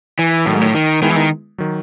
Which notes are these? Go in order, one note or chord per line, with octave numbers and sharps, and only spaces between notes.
E3
A2 D#3 F#3 A3
G#2
A2
D#3
D#3 G#3 B3 E4 G#4 B4
E3
D#3
D#3 F#3